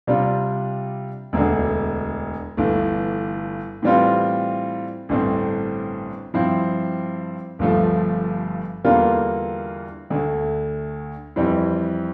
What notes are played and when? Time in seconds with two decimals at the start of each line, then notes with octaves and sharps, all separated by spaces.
0.07 C3 G3 D4 F4
1.33 E1 D2 D3
2.57 G1 G2 E3 A3
3.82 A2 E3 G3 C4 F4
5.09 A1 G2 D3 A3 C4
6.34 G2 F3 C4 E4
7.59 G1 G2 F3 A3
8.84 E2 D3 G3 A#3 F4
10.10 D2 D3 A3
11.36 F2 E3 G3 C4 E4